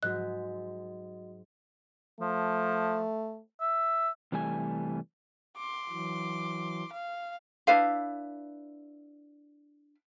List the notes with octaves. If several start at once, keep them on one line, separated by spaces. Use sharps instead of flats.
G#2 F#3 G#3 F#4 D#5 F#6
F3 A3
E5
C3 E3 G3 A3 G#5
C6 D6
E3 F#3
F5
D4 E4 B4 F5